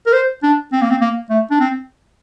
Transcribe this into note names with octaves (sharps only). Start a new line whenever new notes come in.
A#4
C5
D4
C4
A#3
C4
A#3
A3
D4
C4